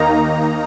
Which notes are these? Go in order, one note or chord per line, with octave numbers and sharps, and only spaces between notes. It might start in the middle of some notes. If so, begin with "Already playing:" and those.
Already playing: D#2 D#3 A#3 D#4 A#5